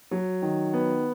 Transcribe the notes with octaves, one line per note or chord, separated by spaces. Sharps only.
F#3
D#3
B3